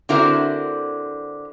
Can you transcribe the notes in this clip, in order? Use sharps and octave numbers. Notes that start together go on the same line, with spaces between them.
D3 C4 E4 F#4 A#4 C5